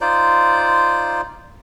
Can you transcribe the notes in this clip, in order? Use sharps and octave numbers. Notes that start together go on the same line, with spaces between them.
D#4 F4 C5 D5